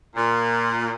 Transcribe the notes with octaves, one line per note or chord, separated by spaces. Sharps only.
A#2